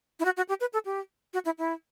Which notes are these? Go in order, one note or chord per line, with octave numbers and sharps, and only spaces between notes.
E4
F#4
F#4
G4
B4
A4
G4
F#4
E4
E4